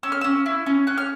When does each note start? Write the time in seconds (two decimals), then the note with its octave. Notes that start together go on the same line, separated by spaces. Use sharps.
0.03 C#4 E6
0.12 F6
0.21 C#4 E6
0.46 E4
0.66 C#4
0.87 C#4 F#6
0.97 F6